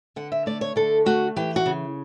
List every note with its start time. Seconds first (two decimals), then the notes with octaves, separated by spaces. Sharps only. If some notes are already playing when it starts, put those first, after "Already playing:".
0.16 D3 F#5
0.32 E5
0.46 A3 D5
0.61 C#5
0.76 D3 A4
1.06 A3 F#4
1.36 E3 G4
1.56 F#4
1.66 C#3